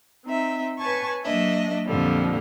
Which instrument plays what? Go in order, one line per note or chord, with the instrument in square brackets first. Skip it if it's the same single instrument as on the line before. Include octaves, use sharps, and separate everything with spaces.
[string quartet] C4 D#4 E5
B4 C#5 G#5 A5 C#6
F#3 A#3 D4 D#5 E5
F2 A#2 D3 F3 G3